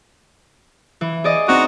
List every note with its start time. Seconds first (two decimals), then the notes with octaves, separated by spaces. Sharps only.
1.01 E3
1.24 G#4 D5 D#5
1.48 C4 D#4 F#4 A#5